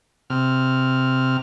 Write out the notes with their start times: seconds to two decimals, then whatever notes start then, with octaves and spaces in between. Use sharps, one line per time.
0.30 C3 F6